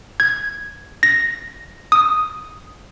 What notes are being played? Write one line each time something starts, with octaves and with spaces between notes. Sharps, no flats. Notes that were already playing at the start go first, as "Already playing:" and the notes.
G#6
A#6
D#6